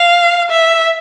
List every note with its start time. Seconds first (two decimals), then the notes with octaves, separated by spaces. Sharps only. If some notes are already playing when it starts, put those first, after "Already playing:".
Already playing: F5
0.50 E5